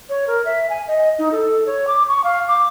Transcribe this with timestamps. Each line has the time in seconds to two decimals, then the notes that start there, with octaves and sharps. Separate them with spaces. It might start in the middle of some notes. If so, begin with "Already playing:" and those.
0.09 C#5
0.27 A#4
0.45 E5
0.70 G#5
0.88 D#5
1.19 D#4
1.32 A4
1.66 C#5
1.88 D6
2.08 C#6
2.24 F5
2.48 D6